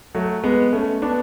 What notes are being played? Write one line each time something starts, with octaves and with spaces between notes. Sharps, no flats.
F#3 A3
G#3 B3
A3 C#4
B3 D4